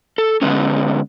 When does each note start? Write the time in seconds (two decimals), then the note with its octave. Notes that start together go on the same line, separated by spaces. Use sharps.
0.18 A4
0.42 D3 G#3 B3 C#4